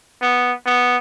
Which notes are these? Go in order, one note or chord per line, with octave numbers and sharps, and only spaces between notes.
B3
B3